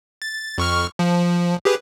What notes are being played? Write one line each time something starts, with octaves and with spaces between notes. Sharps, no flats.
A6
F2 C#6 F6
F3
G4 G#4 B4